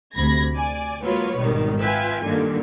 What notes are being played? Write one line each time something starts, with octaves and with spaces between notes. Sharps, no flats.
D2 C3 B5 G#6 A#6
D5 G#5
F#3 G#3 A#3 F4 B4 C#5
G#1 B2 D#3 G3
F4 B4 E5 G5 G#5
G2 A#2 D3 D#3 A#3